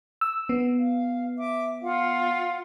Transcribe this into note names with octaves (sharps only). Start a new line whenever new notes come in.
E6
B3
F5
E5 D6
F4 F5 F#5